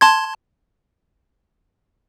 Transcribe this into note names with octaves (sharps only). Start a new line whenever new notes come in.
A5 C6 G#6